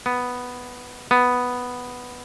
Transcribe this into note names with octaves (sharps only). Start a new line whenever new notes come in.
B3
B3